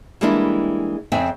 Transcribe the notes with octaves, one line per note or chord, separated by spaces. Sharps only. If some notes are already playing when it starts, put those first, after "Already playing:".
E3 G3 G#3 A#3 D4 E4
F2 C#3 C4 E5 G5 G#5